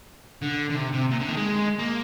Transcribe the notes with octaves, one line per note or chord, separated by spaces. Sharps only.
D3
D3
C3
C3
A#2
D3
D#3
G#3
A#3